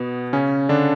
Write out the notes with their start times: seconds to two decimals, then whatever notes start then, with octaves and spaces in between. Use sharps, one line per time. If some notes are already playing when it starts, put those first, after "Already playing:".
Already playing: B2 B3
0.33 C#3 C#4
0.69 D3 D4